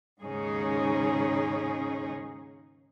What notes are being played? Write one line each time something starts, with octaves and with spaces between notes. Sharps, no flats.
D#2 G#2 C#3 C#4 D#4 G#4